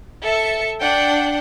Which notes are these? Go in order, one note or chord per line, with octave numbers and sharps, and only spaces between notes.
A4 E5 C#7
D4 F#5 G5